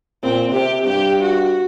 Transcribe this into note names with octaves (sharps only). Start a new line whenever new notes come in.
A#2 C4
C3 G4
G2 G4
F#4